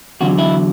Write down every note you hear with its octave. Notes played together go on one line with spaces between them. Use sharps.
E2 D3 F#3 F#4
E4